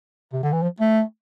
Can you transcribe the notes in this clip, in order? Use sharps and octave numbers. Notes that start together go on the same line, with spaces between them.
C3
D3
E3
F3
A3